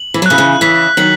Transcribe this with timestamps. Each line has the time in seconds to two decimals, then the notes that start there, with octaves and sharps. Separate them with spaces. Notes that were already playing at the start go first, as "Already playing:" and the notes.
Already playing: F#7
0.14 E3
0.22 F#3
0.26 C#3 E3 F#6
0.38 C#3 E3
0.61 C#3 E3 B6
0.97 D#3 F#3 F#7